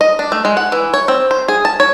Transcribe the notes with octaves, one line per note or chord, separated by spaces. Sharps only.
D#5
D4
A3
G#3
F#5
E3
C#5
C4
C5
G#4
A5
C#5